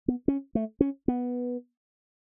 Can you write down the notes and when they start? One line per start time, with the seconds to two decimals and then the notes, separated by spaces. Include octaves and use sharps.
0.08 B3
0.28 C#4
0.55 A3
0.81 C#4
1.08 B3